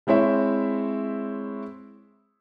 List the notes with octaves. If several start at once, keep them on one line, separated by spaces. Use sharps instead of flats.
G#3 C4 E4 C#5 E5